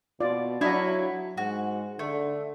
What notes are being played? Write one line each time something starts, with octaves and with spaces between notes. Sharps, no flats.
B2 F4 D5
F#3 D4 E4 C#5 D#5 F5
G#2 F#4
D3 A3